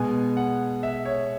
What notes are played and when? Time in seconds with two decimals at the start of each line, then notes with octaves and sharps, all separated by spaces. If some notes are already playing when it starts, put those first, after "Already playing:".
Already playing: B2 G#3 B3 G#5
0.37 F#5
0.83 E5
1.05 C#5